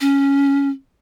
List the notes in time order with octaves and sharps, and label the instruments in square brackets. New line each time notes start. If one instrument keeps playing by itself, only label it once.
[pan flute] C#4